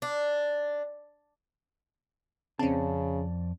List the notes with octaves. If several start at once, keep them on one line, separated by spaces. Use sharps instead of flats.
D4
F2 C#3 C4 C#4 D5 A5